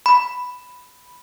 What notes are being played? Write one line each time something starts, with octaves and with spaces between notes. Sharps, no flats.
B5